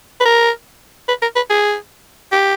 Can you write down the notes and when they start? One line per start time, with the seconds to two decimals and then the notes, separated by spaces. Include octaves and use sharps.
0.20 B4
0.25 A#4
1.08 B4
1.22 A#4
1.36 B4
1.50 G#4
2.32 G4